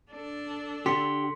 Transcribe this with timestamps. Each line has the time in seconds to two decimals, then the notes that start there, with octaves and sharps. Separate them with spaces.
0.11 D4 A4
0.86 D3 G4 C6 B6 C#7